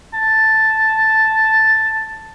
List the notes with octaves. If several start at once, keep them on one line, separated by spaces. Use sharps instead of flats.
A5